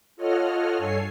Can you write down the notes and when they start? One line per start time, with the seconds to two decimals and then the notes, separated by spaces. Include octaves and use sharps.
0.16 F4 A4 C#5 D#5 F#5 F6
0.78 G2 A4 C#5 G#5 C7